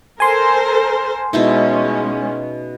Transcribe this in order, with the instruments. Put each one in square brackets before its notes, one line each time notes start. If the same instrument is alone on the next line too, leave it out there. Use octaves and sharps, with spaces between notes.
[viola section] A4 A#4 C5 [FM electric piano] G#5 C6
[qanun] B2 D#4 E4 [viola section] G#3 C#4